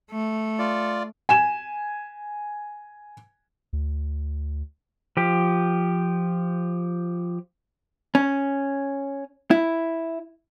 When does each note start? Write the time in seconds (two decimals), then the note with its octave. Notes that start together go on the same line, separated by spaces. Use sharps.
0.11 A3
0.59 F4 D5
1.29 G#5 E7
3.73 D2
5.17 F3 G4
8.15 C#4
9.51 E4